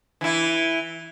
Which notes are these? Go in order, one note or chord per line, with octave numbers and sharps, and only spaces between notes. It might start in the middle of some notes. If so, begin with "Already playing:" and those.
E3 E4